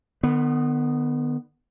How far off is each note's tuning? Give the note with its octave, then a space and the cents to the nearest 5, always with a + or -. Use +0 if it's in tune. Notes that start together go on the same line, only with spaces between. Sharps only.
D#3 -45 B3 +0